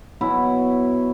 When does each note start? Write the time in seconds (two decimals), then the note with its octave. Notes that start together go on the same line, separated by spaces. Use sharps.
0.21 B2 F#3 E4